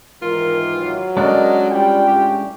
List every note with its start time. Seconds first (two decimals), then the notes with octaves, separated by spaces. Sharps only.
0.22 G#2 D#3 E3 F4 A#4
0.78 F#3
1.17 G#3 C#4 D4 A4 A#4 D5 D#5
1.70 G3 F4 G5
2.07 A2 G4